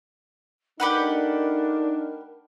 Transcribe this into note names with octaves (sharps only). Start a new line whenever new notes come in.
A3 D4 D#4 G4 A#4 B4 F#5